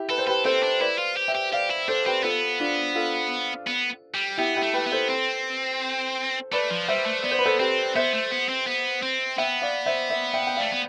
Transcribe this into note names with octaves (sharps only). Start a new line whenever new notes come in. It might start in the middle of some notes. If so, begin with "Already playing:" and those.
Already playing: E4 G4
A4 B4
C5
G4 A4 B4
C4 A4 C5
D4
E4 B4 D5
F4
G4
E5 G5
G4
G4 D5 F5
E4
D4 A4 C5
C4 G4 B4
B3 F4 A4
D4 F4
F4 A4
B3
G3
B3 E4 G4
E4 G4
A3
G4 B4
B3
A4 C5
C4
A3 B4 D5
F3
G3 C5 E5
A3
B3 D5
C5
B4
A4 C5
C4 G4 B4
B3 C5 E5
A3
B3
C4
B3
C4
B3 E5 G5
D5 F5
C5 E5
C5 E5
E5 G5
G5
D5 F5
A3
B3